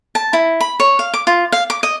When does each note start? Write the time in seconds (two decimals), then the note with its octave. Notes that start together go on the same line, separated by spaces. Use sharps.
0.15 A5
0.33 E4
0.61 B5
0.80 C#5
0.99 F5
1.14 D6
1.27 F4
1.52 F5
1.70 D6
1.83 D#5